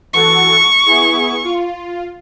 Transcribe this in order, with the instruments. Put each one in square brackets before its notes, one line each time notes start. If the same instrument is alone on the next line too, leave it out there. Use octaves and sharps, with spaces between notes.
[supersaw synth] E3 F#4 A4 [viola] C#6
[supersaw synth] B3 E4 G#4
F4